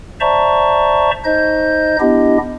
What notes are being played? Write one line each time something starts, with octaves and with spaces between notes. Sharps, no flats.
C5 D5 E5 A5 A#5 C#6
D#4 C5 D#5 G6
B3 D4 E4 G4 D#5